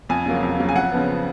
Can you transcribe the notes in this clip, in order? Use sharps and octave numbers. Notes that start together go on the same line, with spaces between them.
F2 G#5
C#3 F#3 A#3
F2
C#3 F#3 A#3
G#5
F2 F#5
C#3 F3 B3